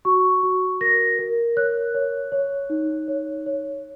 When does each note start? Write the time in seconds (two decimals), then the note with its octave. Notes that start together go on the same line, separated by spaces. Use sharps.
0.05 F#4 C#6
0.43 F#4
0.81 A#4 A#6
1.19 A#4
1.56 C#5 F#6
1.94 C#5
2.32 C#5
2.70 D#4
3.08 C#5
3.46 C#5